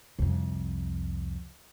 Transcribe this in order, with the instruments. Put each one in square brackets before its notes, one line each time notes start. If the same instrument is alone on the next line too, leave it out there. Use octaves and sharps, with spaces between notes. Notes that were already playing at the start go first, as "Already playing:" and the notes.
[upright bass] C2 F2